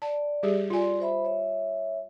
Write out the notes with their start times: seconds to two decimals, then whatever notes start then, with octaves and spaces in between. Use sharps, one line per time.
0.02 D5 A5
0.43 G3 G4 G#4
0.70 F4 D5 G#5 C6
1.00 C5 E5 B5
1.25 C#5 E5